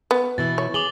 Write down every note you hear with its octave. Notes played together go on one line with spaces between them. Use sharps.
B3
B2 E3 E4 A6
C#5
G#4 D6 F#7 G7